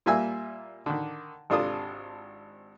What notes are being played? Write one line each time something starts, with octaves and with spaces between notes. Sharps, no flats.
A#2 G3 A#3 E5 G#5 E6
D3 D#3
G#1 C3 D4 F4 A4 D#6